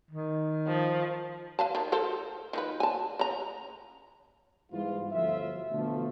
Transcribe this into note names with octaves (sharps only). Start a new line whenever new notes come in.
D#3
F3
B4 F5 A5
D#3
A4 A#4 C5
D#3 F3 B4
G#5 A5
C#3 A#5
G#2 E3 G3 B3 E4 F4
G1 D2 F3 F4 E5
B2 D3 E3 F3 A3